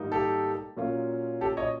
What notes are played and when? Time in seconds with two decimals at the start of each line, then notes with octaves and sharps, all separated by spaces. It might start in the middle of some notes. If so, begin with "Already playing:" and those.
Already playing: G#2 D#3 G3 A#3 D#4
0.12 G4 A4
0.77 A#2 F#3 A#3 C#4 F4
1.41 G4 A4
1.57 C#5 D#5